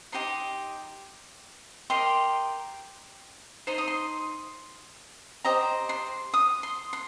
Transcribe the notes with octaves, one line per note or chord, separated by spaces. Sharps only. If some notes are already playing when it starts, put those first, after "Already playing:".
D#4 G4 D#5 C6
G4 A#4 D#5 C6
D#4 C5 D#5 C6
D#6
C6
G4 C5 D#5 A#5
C6
D#6
C6
C6